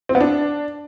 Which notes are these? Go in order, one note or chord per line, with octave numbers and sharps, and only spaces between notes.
C4
B3
D4